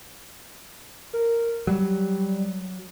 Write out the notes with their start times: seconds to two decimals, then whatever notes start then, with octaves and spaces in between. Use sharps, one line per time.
1.13 A#4
1.67 F#3 G3